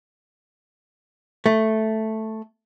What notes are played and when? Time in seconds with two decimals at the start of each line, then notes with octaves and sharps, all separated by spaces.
1.46 A3